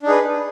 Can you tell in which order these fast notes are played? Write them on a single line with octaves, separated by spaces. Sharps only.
D4 D#4 G#4 B4